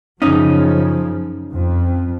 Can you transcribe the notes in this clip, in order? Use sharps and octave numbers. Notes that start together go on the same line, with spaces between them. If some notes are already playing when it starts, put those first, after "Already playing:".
F#2 C#3 F3 C#4 D#4
F2